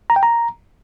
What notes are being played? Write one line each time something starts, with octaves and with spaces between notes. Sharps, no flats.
A#5
G5
A#5